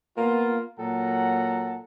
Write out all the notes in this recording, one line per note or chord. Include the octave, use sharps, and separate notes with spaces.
A#3 B3 F4
A#2 F#3 A4 F#5 A#5